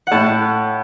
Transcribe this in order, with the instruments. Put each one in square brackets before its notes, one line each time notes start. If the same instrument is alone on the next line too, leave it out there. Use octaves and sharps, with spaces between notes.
[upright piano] A2 [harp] F#5 A5